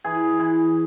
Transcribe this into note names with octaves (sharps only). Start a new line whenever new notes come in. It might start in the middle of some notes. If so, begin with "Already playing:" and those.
E3 G#4
E3